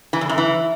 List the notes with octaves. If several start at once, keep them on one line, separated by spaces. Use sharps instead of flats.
E3
E2
F#2
E3